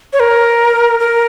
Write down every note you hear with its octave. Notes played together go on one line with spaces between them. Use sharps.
C#5
A#4
A#4